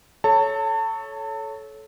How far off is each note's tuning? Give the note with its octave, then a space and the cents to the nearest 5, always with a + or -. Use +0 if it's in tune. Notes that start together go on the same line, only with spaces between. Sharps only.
A4 -20 C#5 +0 A5 +30